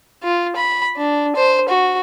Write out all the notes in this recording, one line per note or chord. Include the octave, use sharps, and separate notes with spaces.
F4
B5
D4
C5
F#4